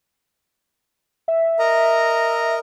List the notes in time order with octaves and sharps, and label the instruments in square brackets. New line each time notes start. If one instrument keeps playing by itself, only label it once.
[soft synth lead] E5
[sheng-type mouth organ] A#4 D#5 A#5